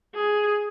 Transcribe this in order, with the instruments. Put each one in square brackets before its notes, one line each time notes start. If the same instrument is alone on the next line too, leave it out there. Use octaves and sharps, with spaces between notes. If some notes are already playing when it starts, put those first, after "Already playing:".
[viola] G#4